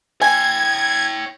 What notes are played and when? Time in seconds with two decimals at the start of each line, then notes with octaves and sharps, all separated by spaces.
0.22 C#5 G5 G#5 G#6